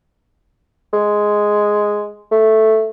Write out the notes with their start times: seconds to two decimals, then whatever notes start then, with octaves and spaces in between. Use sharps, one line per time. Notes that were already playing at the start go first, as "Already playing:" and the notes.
0.93 G#3
2.31 A3